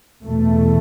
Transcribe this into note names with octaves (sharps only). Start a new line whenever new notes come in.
E2 B2 A3